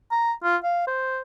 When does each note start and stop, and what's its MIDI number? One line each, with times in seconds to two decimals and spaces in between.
0.11 0.32 82
0.43 0.56 65
0.63 0.83 77
0.87 1.21 72